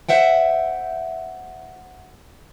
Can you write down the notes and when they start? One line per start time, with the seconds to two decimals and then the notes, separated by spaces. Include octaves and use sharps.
0.09 C5 E5 F#5 G5